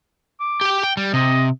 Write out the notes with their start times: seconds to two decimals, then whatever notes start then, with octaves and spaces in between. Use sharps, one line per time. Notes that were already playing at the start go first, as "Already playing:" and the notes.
0.40 D6
0.61 G4 G5
0.83 G5
0.97 G3
1.13 C3 D#5